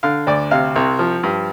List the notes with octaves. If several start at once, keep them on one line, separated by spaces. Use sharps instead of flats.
D3 F5
D2 D5
C3 F5
C2
F3
G2